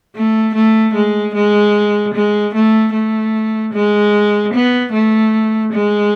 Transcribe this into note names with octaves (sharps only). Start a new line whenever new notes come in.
A3
A3
G#3
G#3
G#3
A3
A3
G#3
B3
A3
G#3